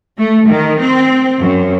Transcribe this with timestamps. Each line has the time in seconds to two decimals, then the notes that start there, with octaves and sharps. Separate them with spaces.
0.18 A3
0.49 D#3
0.80 C4
1.40 F#2